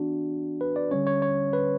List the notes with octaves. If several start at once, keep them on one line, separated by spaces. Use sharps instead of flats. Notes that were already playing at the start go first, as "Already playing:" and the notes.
Already playing: E3 B3 D4 F#4
B4
D5
D3 G3 C#4 C#5
C#5
C#5
B4